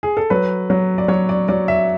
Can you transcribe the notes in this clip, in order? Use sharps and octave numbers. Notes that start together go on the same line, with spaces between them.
G#4
A4
F#3 B4
F#3
D5
F#3 C#5
D5
F#3 D5
E5